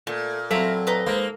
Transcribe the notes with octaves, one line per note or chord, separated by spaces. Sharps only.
A#2 A3
F#3 C4 E4 A4 F5 A#5
B4 D#5 A#5
G#2 A#3 C5